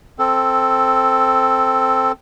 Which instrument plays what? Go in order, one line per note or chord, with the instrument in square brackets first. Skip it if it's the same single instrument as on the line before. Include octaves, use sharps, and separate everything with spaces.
[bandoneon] C4 A4